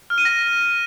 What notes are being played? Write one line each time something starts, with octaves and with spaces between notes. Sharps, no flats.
F6
D#7
A#6